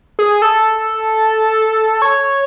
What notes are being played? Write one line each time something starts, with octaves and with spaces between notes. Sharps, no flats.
G#4
A4
C#5